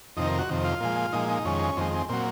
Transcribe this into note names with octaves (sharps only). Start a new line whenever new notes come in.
F2 C3 D#3 D#4
A#4
F#4
F2 C3 D#3
F4
A#2 F3 G#3
A#2 F3 G#3 D#4
D#4
F2 D#3 G#3 C#4
F2 D#3 G#3 C4
C4
A#2 F#3 C4